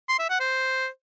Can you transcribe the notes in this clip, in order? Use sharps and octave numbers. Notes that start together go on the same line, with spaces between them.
C6
E5
F#5
C5